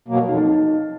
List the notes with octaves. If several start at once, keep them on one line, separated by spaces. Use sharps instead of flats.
B2 F#3 A#3
F2 D#4
D#4